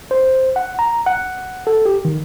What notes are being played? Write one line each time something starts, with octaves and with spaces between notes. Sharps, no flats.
C5
F#5
A#5
F#5
A4
G4
D#3